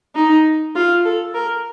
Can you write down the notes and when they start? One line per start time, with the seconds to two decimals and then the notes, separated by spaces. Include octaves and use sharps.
0.15 D#4
0.76 F4
1.05 A4
1.35 A#4